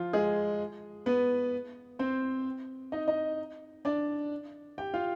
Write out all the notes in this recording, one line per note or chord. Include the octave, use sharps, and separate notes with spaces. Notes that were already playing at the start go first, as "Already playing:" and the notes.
Already playing: F3 F4
G#3 G#4
B3 B4
C4 C5
D#4 D#5
D#4 D#5
D4 D5
G4 G5
F4 F5